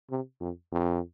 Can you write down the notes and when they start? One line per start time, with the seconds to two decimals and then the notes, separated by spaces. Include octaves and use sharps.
0.10 C3
0.40 F2
0.72 F2